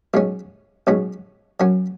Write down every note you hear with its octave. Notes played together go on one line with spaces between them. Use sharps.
B1 B2 G#3 C#4
B1 B2 G#3 C#4
F#2 F#3 C#4